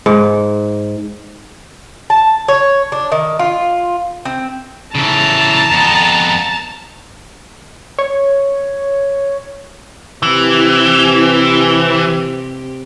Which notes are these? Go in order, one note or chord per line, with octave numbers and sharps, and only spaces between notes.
G#2
A5
C#5
D4
D#3
F4
C4
C#3 E3 A5 A#5
F2 B3
C#5
C3 E3 C4 G4